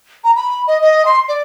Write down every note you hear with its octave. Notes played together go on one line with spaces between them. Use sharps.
A#5
B5
D#5
D#5
C6
D5